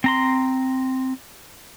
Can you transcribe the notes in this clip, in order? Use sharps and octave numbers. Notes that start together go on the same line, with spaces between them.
C4 A#5 C6